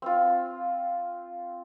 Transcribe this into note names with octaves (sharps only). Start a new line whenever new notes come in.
C4 F4